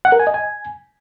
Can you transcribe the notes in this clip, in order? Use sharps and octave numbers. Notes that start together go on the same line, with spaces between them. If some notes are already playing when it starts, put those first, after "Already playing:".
F#5
A#4
G#5
D#5
G#5